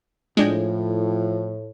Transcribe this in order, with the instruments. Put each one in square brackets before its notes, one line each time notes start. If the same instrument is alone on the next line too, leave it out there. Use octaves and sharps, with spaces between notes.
[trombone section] A2 [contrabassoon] F3 [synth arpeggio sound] G#3 D4 G5